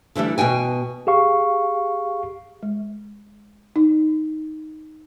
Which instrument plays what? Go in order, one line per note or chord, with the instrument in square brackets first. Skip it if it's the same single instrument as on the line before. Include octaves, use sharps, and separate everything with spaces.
[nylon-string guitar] D3 E3 G3 A3
B2 F#4 G5 G#5
[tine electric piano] G4 G#4 F5 C#6
[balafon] G#3
D#4